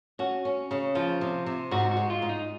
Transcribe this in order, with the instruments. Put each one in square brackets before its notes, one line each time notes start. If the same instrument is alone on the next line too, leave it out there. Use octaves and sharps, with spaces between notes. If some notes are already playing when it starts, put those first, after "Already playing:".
[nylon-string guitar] C#4 [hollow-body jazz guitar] F#4
[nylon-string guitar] C#4
C#3
[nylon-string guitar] F3 [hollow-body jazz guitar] F4
[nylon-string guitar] C3
C3
[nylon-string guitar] G#2 [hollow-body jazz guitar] F#4
[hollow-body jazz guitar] F#4
[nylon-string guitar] G#3
[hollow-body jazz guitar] F4
[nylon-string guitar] G#2
[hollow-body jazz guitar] D#4